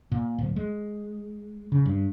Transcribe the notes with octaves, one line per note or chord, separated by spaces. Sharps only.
A#2
D1
G#3
C#3
G2